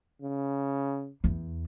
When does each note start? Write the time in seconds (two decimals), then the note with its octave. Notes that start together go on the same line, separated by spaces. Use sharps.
0.22 C#3
1.24 E2